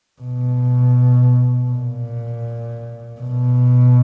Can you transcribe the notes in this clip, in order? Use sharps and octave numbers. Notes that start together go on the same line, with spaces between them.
B2
A#2
B2